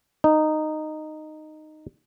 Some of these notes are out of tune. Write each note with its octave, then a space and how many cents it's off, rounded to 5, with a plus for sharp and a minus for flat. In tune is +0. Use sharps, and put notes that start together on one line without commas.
D#4 -10